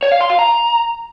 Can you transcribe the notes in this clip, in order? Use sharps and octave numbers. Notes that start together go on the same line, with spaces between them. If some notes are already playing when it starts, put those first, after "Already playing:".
C#5
F5
C6
F5
A#5